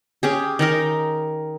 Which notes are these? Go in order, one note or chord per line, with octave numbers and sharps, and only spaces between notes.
C#4 G4 G#4
D#3 D#4 A#4